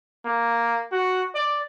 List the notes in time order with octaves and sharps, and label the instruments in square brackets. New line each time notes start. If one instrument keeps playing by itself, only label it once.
[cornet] A#3
F#4
D5